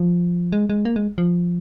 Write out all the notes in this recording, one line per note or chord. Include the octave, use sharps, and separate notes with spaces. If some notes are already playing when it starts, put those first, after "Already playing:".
Already playing: F3
G#3
G#3
A#3
G#3
F3